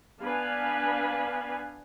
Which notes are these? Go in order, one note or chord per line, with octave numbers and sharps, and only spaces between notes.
B3 D4 B4 F5 G#5